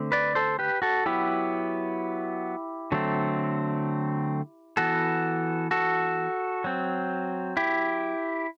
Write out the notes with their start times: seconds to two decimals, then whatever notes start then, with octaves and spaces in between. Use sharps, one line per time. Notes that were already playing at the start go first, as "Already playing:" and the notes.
Already playing: D3 A3 C4
0.12 B4 D5
0.35 A4 C5
0.59 G4 B4
0.82 F#4 A4
1.06 F#3 B3 E4 G4
2.92 D3 F#3 A3 C4
4.77 E3 B3 F#4 A4
5.71 F#4 A4
6.64 F#3 C4
7.57 E4 G4